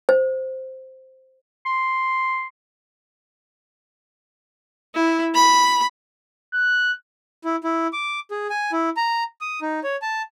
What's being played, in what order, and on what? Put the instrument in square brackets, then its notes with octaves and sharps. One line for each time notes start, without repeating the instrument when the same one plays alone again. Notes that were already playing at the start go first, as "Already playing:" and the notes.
[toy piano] C5
[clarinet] C6
[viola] E4
B5
[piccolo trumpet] F#6
[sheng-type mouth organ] E4
E4
D6
G#4
G#5
E4
A#5
D#6
D#4
C#5
A5